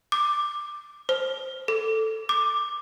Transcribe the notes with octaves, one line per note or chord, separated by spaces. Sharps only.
D6
C5
A4
D6